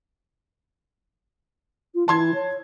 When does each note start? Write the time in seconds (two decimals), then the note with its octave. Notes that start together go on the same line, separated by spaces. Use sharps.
1.95 F4
2.08 E3 A5 C6 G#6
2.34 C#5